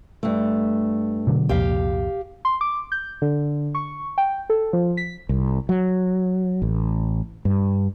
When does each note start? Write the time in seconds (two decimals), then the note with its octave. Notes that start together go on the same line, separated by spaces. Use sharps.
0.23 G2 A3
1.27 B2 D3 F#3
1.49 C2 F2 A#2 G4 F5
2.45 C6
2.61 D6
2.92 G6
3.22 D3
3.75 C#6
4.18 G5
4.50 A4
4.73 F3
4.97 B6
5.29 C2
5.69 F#3
6.62 A1
7.45 G2